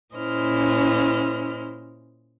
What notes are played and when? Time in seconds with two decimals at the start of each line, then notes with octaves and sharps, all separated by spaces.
0.14 A#2 C#4 E4 C5 D#5 F6